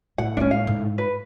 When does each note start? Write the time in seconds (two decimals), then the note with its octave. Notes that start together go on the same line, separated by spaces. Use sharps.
0.18 A2 E3 F#5
0.37 G#3 A#3 C#4 D4
0.51 F5
0.67 G#2
0.98 B4